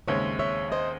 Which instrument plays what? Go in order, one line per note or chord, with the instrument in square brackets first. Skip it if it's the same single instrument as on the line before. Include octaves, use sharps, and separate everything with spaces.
[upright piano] D#2 C#3 G#3 C4 [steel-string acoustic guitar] C#5 E5
[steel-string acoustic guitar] C#5 E5
C5 D#5